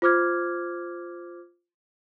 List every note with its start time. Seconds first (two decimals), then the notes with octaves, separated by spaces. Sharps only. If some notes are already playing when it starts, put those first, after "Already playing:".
0.02 F4 C5 D6 F6 G#6